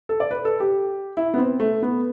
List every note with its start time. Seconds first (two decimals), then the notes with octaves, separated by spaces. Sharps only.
0.09 A4
0.20 D5
0.31 B4
0.45 A4
0.60 G4
1.17 E4
1.34 B3
1.38 C4
1.60 A3
1.82 B3